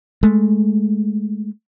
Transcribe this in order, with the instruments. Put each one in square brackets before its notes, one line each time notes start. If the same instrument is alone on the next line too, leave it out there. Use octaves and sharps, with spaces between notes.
[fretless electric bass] G#3 A3